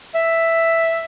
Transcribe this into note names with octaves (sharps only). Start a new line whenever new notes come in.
E5